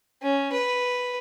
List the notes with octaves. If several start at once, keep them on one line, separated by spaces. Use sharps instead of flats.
C#4
B4